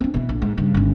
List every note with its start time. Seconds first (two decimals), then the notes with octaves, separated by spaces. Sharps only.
0.01 C4 D4
0.14 B2 E3
0.29 A#1
0.42 G#2
0.57 G2 C#3
0.74 G1 C#4